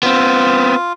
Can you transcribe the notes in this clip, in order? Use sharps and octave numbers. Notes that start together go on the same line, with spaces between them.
B3 C4 F4